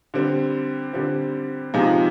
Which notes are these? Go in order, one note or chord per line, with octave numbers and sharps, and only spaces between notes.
D3 G3 C4
D3 G3 C4
C3 F3 G#3 D#4